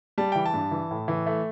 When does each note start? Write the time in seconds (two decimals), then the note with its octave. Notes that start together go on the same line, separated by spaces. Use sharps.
0.18 G3 A5
0.32 E3 G5
0.46 A5
0.54 G2
0.71 E3
0.91 A2
1.08 E3
1.26 A3